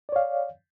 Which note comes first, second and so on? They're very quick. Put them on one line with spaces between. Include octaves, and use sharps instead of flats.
D5 C#5 F5